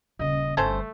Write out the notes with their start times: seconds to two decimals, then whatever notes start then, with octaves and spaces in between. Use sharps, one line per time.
0.19 D#1 C#3 D#5
0.57 G1 A3 C#4 A4 C5